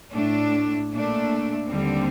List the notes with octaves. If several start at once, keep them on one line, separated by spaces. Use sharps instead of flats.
A2 A3 D4
A#2 A3 D4
D#2 D3 G3 C4